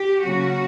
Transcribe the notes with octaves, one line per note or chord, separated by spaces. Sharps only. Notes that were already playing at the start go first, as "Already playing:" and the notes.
Already playing: G4
C#3 F#3 A#3 C#4 F#4